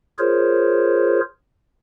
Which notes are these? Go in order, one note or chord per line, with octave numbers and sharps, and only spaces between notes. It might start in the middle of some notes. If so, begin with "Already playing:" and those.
F4 G#4 A#4 C5 C#5